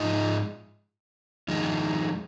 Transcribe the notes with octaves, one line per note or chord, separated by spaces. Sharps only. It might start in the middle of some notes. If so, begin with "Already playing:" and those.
Already playing: G#2 F3 G#3 D#4
F2 D#3 G#3